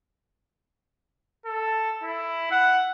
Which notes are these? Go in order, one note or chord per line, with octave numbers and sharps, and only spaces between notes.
A4
E4
F#5